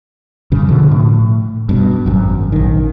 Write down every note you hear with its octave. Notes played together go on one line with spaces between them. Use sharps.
G2 C#3
B2 D3 F3
A2
G2 B2
G#1 F#2
A#1 D#3